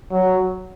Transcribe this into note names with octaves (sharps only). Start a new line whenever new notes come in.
F#3